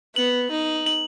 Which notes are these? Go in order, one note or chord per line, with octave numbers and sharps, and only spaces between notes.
B3 F#7
D#4
F#7